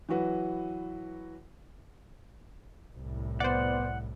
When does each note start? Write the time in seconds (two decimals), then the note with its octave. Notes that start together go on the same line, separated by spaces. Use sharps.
0.09 E3 F#3 F#4 B4
2.97 C2 A2
3.40 B3 C5 D5 F#5